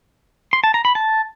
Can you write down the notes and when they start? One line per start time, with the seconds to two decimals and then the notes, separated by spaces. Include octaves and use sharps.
0.53 C6
0.64 A5
0.74 A#5
0.85 B5
0.95 A5